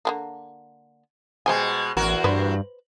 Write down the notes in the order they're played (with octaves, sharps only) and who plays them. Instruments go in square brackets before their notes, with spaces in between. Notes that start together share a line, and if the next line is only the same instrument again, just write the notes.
[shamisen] D3 G#3 A#3
[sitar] B2 G#3 [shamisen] G3 C5 G#5
[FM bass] A1 [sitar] E2 F#4 A#4
[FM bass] G2 [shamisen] B4 C5